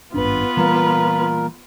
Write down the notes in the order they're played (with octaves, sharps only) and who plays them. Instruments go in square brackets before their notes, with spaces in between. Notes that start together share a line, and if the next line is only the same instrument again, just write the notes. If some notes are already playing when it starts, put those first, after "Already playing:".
[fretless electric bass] G#1 G2 D4 [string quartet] B3 F4 B4
[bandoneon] A#2 A#4 [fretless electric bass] E3 G3 A#3